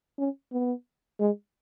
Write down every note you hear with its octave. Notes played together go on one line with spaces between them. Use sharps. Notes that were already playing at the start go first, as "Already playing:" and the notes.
C#4
B3
G#3